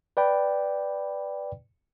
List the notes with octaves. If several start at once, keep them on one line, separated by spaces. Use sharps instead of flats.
B4 D5 G5 B5